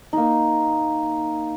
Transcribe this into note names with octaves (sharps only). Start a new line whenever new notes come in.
A#3 D#4